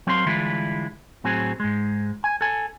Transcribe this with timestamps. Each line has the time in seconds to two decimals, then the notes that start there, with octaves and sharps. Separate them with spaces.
0.07 F#3 C4 A#4 F5 B5 C6
0.26 D3 E3 G3 G#3 E4 F4
1.24 A2 F#3 C4 G#4
1.60 G#2 G#3
2.24 G#5
2.41 A4 G#5